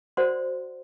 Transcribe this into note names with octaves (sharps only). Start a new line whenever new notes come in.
F#4 A#4 C5 D5 F#5 C6